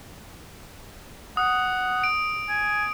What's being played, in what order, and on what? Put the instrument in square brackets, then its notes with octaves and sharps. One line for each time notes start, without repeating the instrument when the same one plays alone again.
[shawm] F#5 [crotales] D#6
[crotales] D7
[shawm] G#5